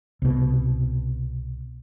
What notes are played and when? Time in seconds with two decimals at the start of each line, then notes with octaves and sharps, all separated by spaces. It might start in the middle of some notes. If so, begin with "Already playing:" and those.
0.22 C2 B2